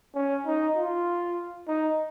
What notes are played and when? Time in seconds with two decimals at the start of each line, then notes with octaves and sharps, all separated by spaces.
0.15 C#4
0.46 D#4
0.76 F4
1.68 D#4